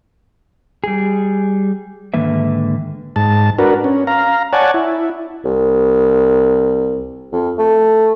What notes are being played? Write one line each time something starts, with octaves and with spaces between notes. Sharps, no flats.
G3 G#4
G#2 D3 D#3 A#3 B4 E5
G#2 A5
D4 F#4 A#4 B4
C#4
F5 A#5
C#5 D5 F#5 G#5 A5
E4
C2
F2
A3